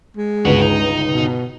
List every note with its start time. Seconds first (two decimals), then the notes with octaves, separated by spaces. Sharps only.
0.17 G#3
0.45 G1 C#2 B3 F#4
0.62 D#4
1.12 B2